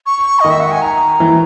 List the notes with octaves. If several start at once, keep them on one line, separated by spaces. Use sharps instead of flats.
C#6
D#3 D#5
E5
F#5
G#5
A#5
E3